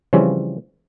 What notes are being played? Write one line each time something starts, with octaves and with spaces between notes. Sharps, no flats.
C#3 E3 F3 G3 C4 C#4